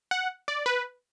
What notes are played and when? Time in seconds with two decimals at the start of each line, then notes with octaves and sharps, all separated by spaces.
0.11 F#5
0.48 D5
0.66 B4